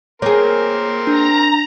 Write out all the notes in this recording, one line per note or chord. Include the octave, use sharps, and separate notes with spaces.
A#3 C4 G#4 A#4 C#5 C6
D4 A#5